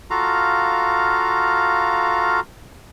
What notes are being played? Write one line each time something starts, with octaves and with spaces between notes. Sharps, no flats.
F4 F#4 A4 F5 A#5